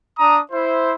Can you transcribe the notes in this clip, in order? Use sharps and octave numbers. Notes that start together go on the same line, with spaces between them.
D4 A#5 D#6
E4 C5